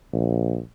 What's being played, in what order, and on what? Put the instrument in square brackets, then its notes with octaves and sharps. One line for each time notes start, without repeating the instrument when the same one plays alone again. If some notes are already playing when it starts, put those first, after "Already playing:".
[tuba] A#1